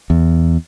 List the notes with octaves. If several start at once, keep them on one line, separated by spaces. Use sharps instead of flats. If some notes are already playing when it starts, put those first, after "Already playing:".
E2